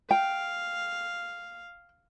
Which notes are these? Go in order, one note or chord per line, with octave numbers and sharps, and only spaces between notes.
F5 G5